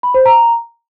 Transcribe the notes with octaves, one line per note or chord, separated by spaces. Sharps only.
B5
C5
A#5